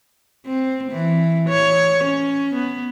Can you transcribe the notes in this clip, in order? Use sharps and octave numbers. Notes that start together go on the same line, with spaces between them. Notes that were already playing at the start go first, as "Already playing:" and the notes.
C4
E3
C#5
C#4
B3